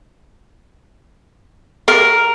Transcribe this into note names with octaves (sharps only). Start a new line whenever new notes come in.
A#4